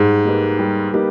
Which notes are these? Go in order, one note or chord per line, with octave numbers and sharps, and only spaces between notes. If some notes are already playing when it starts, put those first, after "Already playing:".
Already playing: G#2 G3
A#3 D#4 G4 B4
G3
A#3 D#4 G4 B4